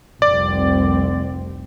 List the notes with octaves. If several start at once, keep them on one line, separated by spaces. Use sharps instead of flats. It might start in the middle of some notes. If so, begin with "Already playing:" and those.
F1 C2 C4 D5